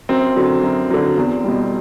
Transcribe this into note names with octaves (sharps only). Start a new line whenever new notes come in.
F#2 C4
D3 F#3
F#2
D3 F#3
E2
B2 G3